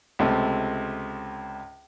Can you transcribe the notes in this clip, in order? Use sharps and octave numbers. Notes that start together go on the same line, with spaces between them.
C#2 C3 A3